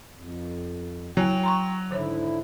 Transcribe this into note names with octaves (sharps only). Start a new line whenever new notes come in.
F2
F#3 E4 G5 G#5
A#5 C6 C#6
G#2 D3 D#3 E4 C5 C#5